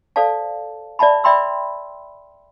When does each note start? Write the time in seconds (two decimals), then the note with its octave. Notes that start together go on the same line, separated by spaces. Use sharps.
0.16 A4 C5 D5 F5 A5
0.99 D5 E5 A5 B5
1.24 D5 E5 G5 B5 C6 E6